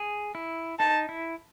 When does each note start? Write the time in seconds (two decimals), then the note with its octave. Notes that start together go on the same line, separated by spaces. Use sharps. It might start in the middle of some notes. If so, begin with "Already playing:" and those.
Already playing: G#4
0.35 E4
0.79 D#4 A5
1.09 E4